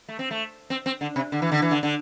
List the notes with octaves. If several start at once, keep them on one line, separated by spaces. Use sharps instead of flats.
A3
C4
A3
C4
C4
D3
C3
D3
E3
D3
E3
D3
D3